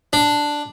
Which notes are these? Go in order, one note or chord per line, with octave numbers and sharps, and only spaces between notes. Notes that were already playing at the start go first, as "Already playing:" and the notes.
D4